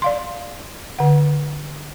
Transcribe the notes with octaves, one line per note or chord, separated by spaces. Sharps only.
D5 F5 C6
D3 F#5